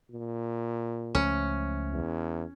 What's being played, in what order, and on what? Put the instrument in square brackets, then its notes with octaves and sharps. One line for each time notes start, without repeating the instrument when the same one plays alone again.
[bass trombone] A#2
[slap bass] C#2 F3 A3 [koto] C#4
[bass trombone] E2